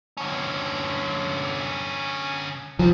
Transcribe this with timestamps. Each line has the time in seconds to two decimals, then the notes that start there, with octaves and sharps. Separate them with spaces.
0.17 D3 C#4
2.79 E2 F3